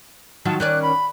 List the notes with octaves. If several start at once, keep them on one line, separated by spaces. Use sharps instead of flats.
D#3 F#3 F4 A5
D#3 C#4 D5 F#6
B5